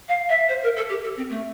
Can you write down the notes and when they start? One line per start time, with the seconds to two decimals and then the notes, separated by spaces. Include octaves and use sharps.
0.08 F5
0.29 E5
0.48 C5
0.63 A#4
0.76 A4
0.89 G4
1.03 A4
1.16 C4
1.29 A3